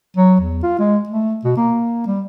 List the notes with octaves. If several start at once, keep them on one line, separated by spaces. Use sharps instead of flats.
F#3
E2
F4
G#3
A3
B2
A#3
G3